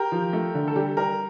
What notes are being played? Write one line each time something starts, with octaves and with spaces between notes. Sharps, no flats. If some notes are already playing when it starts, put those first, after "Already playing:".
Already playing: G4 A#4
F3
A3
D3
A4
G3 G4
G3 G4 A#4